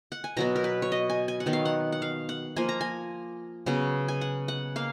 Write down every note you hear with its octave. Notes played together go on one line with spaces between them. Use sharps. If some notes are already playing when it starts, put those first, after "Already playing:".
F#5
G#5
B2 F#3 B3 A#5
A#4
B4
C#5
D#5
G#5
G#5
F#5
D#3 F#3 B3
F5
F#5
F#5
F5
F#5
F3 A#3 G#5
A#5
G#5
C#3 F#3 B3
G#5
F#5
F#5
A#3 F5